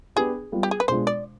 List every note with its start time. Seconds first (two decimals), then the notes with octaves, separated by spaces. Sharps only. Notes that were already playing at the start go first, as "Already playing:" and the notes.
0.16 B3 D4 G4 G#4 B4
0.52 G3 B3 F4
0.63 G4
0.71 G#4
0.80 B4
0.88 B2 G#3 D4 F4 C5
1.07 D5